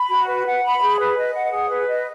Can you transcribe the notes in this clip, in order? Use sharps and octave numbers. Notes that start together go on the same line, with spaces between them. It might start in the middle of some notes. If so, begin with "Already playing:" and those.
Already playing: B5
F#4
B4
F#5
B5
G#4
B4
D#5
F#5
G#4
B4
D#5